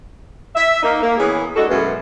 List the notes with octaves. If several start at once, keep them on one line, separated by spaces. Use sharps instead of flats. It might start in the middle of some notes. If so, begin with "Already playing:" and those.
E5
A#3 D#4
A#3
E3 B3 C#4 G#4
G#3 D4 D#4 F#4 A4
F#2 B2 E3 G#3 A3 B3